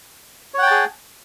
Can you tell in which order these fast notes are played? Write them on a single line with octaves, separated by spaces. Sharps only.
C#5 F#5 G5 A5 G#4